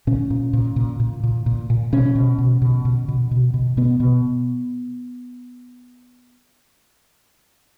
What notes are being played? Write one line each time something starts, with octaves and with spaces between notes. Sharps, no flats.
A#2 C#4
A#2
A#2
A#2
A#2
A#2
A#2
A#2
B2 C#4
B2
B2
B2
B2
B2
B2
B2
B2 B3
B2